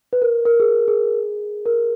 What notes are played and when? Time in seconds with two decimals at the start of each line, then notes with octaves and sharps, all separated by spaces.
0.13 B4
0.22 A#4
0.46 A#4
0.60 G#4
0.88 G#4
1.66 A#4